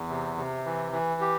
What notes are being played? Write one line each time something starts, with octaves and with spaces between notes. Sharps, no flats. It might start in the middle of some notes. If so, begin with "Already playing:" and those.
Already playing: E2
C3
C3
E3
E3
G4